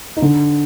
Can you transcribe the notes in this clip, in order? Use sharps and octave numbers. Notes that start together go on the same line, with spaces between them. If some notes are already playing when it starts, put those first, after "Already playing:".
D#4
D3 D4